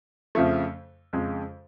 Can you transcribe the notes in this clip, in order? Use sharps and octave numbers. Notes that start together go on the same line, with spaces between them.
F2 C#3 F3 A3
F2 C#3 G#3